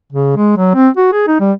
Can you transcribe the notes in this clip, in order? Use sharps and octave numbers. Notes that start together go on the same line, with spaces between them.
C#3
G#3
F#3
C4
F#4
G#4
D#4
G3